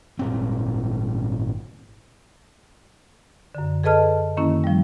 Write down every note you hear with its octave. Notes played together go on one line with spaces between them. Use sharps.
G#1 A#2 C4
F#2 D3
G#4 A4 B4 D#5 A5 F6
F#2 D#3 A#3 C#4 E4
F3 G3